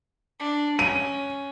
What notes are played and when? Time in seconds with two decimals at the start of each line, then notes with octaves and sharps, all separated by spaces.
0.40 D4
0.79 C#4 D#7